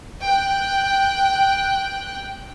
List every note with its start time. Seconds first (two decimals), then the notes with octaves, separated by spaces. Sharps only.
0.23 G5 F#6